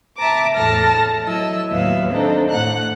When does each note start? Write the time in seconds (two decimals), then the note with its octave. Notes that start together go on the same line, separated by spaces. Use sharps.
0.17 E5 A5 A#5 D6
0.55 E2 A2 A4 A5 F6 A#6
1.24 F#3 E4 D#5 E6
1.69 D#2 A2 F#3 B3 E5 F5
2.11 C4 D4 D#4 A4
2.50 A2 F#5 F#6